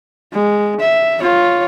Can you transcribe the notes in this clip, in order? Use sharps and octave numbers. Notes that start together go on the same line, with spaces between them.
G#3
E5
F4 C#5